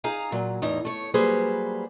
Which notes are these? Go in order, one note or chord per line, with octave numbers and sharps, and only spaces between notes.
D#4 G#4 F5 G#5 A#5
A#2 F#3
E2 A2 D#4
A3 C#5
F#3 G3 A#3 G#4 B4 C5